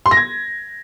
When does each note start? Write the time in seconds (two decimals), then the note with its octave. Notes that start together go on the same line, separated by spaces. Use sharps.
0.06 C6
0.11 A#6
0.17 G#6